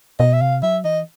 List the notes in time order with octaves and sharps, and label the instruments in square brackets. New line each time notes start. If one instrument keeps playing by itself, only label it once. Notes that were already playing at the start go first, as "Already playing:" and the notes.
[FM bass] B2 [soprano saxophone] D#5
[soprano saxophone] E5
[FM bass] C3 [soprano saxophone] F5
[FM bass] F#3 [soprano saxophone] E5
[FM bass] E3 [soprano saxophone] D#5